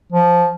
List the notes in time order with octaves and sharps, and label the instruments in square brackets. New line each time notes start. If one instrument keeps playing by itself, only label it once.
[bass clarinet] F3